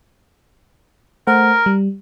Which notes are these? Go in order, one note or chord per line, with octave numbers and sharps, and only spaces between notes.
A3 A#4 C5 F#5
G3